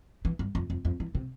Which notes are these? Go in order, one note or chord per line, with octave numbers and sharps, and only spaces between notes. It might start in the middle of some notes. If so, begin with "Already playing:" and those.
E3
G2
F2
F2
F2
E3
C3